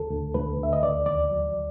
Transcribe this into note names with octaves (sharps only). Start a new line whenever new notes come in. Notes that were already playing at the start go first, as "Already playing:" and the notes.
Already playing: D2 A4
D2
D2 B4
D2 E5
D#5
D#2 D5
D#2 D5
F#3